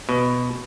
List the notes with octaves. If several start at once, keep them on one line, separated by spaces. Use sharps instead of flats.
B2